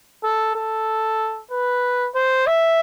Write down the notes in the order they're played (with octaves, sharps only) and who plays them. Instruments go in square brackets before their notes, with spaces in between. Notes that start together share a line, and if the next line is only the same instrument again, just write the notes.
[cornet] A4
A4
B4
C5
E5